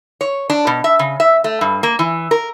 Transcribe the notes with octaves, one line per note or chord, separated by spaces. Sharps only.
C#5
D4
B2
E5
C#3
E5
A3
G2
A#3
E3
A#4